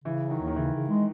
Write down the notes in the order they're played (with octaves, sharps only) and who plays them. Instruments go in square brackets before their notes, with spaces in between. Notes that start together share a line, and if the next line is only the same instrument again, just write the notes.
[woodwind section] C#3 [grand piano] E3
[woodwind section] F#3
[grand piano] D#3
[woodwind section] D#2
[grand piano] D#3
[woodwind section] C#3 [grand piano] E3
[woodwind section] C#3
G#3